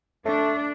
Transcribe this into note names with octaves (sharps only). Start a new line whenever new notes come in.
A3 D4